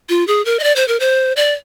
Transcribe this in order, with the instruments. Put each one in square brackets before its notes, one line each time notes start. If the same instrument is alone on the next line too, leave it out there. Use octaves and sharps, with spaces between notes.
[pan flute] F4
G#4
A#4
D#5
D5
C5
A#4
C5
D5